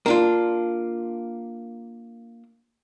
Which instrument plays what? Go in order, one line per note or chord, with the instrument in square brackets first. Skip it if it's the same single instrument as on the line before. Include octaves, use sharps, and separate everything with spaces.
[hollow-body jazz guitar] A#3 D4 F4